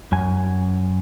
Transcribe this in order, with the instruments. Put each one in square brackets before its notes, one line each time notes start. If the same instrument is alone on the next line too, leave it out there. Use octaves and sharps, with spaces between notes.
[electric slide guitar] F#2 G#5